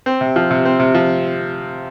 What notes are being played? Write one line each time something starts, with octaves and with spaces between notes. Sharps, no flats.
C4
C3
F3
C3
C4
C3
F3